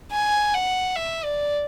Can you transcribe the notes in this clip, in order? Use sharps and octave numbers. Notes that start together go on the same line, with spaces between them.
G#5
F#5
E5
D5